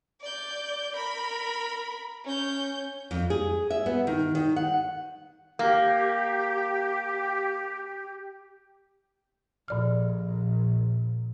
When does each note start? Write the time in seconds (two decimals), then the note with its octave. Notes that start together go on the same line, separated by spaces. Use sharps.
0.21 D5 G6
0.96 A#4 B5
2.25 C#4 G6
3.11 F2
3.30 G#4
3.70 E5
3.86 B3
4.07 D#3
4.35 D#3
4.56 F#5
5.59 A#3 G4
9.68 A#1 A#2 D5 F6